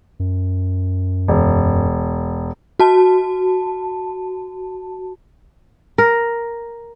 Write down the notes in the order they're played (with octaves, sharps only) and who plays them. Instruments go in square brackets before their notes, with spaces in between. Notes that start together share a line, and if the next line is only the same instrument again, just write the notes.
[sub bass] F#2
[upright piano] E1
[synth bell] F#4 A5
[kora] A#4